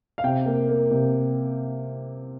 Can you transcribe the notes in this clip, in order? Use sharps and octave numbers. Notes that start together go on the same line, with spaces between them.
F5
C3 G5
A#3
A#3
C3